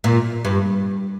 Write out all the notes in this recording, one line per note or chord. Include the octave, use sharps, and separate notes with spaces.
A#2
G2